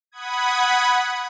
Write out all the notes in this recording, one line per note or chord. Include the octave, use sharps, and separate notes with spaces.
F#5 B5 D#6 G#6